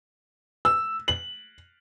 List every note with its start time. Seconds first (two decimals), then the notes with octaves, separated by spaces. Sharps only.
0.65 E6
1.08 F#7